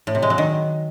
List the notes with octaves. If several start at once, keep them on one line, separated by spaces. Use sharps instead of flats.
A2
C3
G#3
F#3
D#3